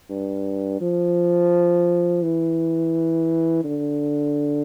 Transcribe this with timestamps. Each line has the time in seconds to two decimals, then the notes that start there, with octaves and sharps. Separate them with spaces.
0.10 G2
0.81 F3
2.23 E3
3.64 D3